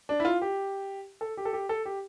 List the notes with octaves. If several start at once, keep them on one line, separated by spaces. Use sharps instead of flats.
D4
E4
F4
G4
A4
G4
A4
G4
A4
G4